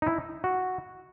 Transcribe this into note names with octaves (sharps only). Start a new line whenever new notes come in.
D#4
E4
F#4